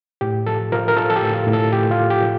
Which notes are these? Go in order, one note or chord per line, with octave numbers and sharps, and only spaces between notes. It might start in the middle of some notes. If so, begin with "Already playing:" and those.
A2 G4
F3 A4
F3 A#4
A#4
F3 A4
A4
G4
A2
F4
A2
A4
A2 G4
F4
F3
G4
F3